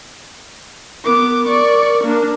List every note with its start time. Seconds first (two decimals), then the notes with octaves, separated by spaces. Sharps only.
1.05 B3 A#4 D6
1.48 D5 C#6
2.04 A#3 D4